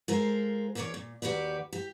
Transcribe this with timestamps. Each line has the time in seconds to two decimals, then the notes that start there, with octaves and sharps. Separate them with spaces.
0.08 G#3 F4 A4 A#4 C5
0.75 E2 A#3 C4 A4 C#5 D5
0.94 A#2
1.22 D#2 F#4 G4 B4 D5
1.73 G4